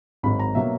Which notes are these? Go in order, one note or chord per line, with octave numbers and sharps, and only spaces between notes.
G#1 G#2 F#3 B5
A#5
B2 F#3 A#3 E5